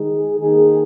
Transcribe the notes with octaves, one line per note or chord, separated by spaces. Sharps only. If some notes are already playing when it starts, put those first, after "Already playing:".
Already playing: D#3 G#3 D#4 G#4
D#3 A#3 D#4 G#4